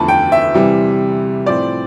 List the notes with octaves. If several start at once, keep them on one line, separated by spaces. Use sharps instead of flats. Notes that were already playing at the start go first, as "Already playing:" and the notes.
Already playing: E2 D3 F3 A3 A5 B5
G5
E5
C3 E3 G3
A2 F3 C4 D5